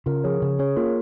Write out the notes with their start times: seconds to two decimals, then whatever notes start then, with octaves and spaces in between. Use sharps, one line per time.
0.06 C#3 F4 A#4
0.24 F3 G#4 C#5
0.42 C#3
0.59 C#4 G#4 C#5
0.76 A#3 F4 A#4